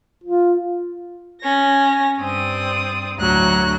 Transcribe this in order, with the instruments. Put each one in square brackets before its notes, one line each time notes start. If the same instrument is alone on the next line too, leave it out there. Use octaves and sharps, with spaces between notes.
[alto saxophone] F4
[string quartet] C#4 A#6
G2 C4 D5 D#6
D2 A2 F#3 A#5 F#6